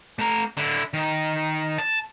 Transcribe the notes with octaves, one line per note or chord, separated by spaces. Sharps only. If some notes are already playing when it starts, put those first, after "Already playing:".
A3 A#5
D3 E4
D#3
A5